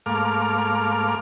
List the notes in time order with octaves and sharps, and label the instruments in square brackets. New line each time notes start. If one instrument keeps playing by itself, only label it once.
[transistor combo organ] G#2 A3 A#3 F5 D6 F6